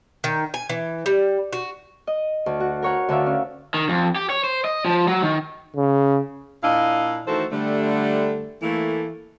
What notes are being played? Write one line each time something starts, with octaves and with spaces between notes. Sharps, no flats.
D#3
G#5
E3
G3
F#4
D#5
D2
F#4
A#4 C#5 F#5
D2 D3 E5 F5
C#4
D#3
F2
G4
C#5
C5
D#5
F3
F#3
D#3
C#3
A#2 D4 E4 D#5 F5
D#3 E3 A3 F#4 A4 C5
D3 G3 A3
E3 A3 A#3